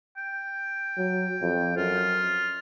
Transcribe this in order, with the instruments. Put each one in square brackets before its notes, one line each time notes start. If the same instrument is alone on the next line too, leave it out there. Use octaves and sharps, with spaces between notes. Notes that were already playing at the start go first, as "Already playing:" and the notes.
[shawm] G5
[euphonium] F#3
F2
[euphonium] F#2 [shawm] F4